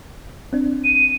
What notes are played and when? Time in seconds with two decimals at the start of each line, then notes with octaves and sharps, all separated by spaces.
0.53 C4 D4
0.84 D#7